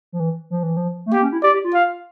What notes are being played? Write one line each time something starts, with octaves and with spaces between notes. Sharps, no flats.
F3
E3
F3
E3
F3
A3
A#3 G4
C#4
E4
G4 D5
G4
F4
F5